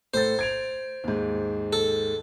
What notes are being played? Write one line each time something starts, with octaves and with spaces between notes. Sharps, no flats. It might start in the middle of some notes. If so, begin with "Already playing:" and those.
A2 A4 C5 A6
G#6 D7 F7
D#2 G#2
A4